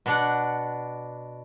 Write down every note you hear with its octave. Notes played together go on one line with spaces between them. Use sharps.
B2 D4 F#5